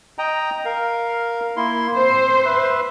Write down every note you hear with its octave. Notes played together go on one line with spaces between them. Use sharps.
D#5 G5 A#5
A#4 F5
A#3 E4 C6
C4 C5
B4 E5